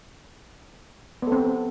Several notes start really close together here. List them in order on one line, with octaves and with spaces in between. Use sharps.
B3 A4 C4